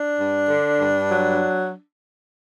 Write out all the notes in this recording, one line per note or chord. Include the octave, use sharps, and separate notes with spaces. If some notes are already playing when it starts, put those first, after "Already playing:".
Already playing: D4
G2
D3
G2
F#3